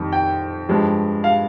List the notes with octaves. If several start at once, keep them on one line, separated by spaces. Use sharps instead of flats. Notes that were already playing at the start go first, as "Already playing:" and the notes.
Already playing: F2 D#3 G3
G5
G2 F3 G#3
F5